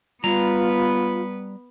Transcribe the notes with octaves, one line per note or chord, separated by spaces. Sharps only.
G3 B3 F4 B4 A#5